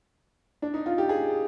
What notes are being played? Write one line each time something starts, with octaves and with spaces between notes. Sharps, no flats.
D4
D#4
F4
G4
G#4